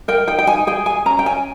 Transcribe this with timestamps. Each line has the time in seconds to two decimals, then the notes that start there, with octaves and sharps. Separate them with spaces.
0.08 A#4 G5
0.27 D#4 G5
0.39 G5
0.47 D#4 G#5
0.67 G#4 G5
0.86 G#4 G#5
1.06 C#4 A#5
1.19 G5
1.25 C#4 G#5